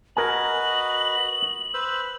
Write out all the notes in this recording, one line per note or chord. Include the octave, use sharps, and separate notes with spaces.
F#4 A#4 B4 D#5 G#5 F#7
B4 C5 E6